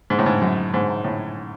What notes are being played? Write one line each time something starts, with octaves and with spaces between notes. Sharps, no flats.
G#2
A2
G#2
F#2
G#2
A2